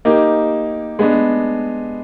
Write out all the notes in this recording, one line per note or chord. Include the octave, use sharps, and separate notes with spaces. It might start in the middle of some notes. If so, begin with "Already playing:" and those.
A#3 D#4 G4
G#3 B3 D4